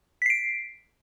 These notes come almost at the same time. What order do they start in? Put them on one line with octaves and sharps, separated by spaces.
B6 C7 D7